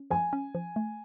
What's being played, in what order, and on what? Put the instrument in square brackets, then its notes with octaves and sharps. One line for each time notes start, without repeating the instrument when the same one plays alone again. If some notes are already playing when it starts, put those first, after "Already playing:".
Already playing: [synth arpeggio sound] C#4
[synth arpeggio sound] F3 [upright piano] G#5
[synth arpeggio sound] C#4
F3
A3